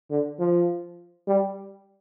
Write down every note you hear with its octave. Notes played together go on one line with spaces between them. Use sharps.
D3
F3
G3